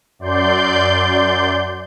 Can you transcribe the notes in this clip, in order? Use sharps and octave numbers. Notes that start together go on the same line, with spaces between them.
F#2 D5 C6 G6